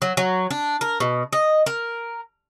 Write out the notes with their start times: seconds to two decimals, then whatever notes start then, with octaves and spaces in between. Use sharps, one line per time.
0.02 F#3
0.17 F#3
0.50 D4
0.81 A#4
1.00 B2
1.33 D#5
1.66 A#4